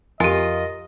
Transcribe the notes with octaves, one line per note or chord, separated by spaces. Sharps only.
F2 F4 G4 A#4 D#5 F5 G#5